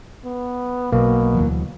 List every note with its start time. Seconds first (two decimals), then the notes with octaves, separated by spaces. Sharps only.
0.25 B3
0.92 B1 B2 A#3
1.35 D2 E3 F#3